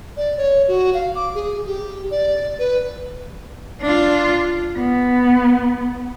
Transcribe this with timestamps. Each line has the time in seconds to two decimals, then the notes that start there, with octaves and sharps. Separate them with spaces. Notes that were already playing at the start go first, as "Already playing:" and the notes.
0.17 D5
0.37 C#5
0.68 F#4
0.94 F5
1.15 D6
1.35 G#4
1.67 G4
2.11 D5
2.59 B4
3.82 D4 F4
4.77 B3